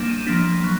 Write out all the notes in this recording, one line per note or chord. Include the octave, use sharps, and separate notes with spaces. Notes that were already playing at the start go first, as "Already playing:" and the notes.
Already playing: G3 A#3 D4 E7
D#7
F3 A#3 D4 B6
F#3